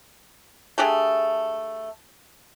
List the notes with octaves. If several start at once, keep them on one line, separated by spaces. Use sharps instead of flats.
A3 D4 G4 G#4